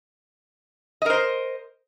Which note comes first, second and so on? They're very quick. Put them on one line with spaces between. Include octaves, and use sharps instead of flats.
D#5 A#4 C5